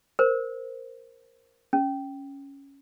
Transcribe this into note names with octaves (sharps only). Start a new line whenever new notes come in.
A#4 C5
C#4